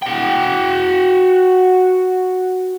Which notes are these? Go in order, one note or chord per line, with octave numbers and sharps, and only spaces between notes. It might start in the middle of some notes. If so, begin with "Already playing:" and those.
F#4 G5